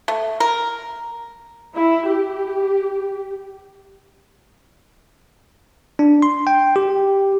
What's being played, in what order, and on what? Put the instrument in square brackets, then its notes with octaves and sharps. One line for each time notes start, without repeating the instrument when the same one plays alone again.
[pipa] A3
A#4
[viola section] E4
G4
[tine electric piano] D4
C6
G5
G4